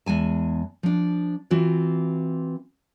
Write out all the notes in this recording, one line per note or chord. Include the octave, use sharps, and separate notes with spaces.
E2 G#3 G#5 A5
F3 D4
E3 C4 F4 F#4